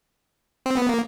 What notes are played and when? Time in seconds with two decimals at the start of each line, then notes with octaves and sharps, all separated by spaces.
0.66 C4
0.77 B3
0.89 A#3